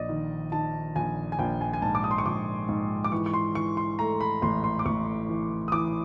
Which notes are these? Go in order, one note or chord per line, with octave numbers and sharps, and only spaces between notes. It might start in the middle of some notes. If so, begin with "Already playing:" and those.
Already playing: A#1 D5 D#5
D#3
D#3 A5
A#1 G#5
G#5
A#1 G5
G#5
G#5
G#2 A5
D6
D#6
C6
C#6
A#1 D6
G#2
D6
E3 C#6
C#6
C6
E3 C#6
C6
A3 A#5
B5
A1 C6
C6
D6
A1 C#6
E3
D#6
E3 D6